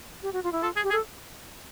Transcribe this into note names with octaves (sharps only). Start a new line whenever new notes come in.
G4
F#4
F4
E4
F4 A4
G#4
G4
G#4
A4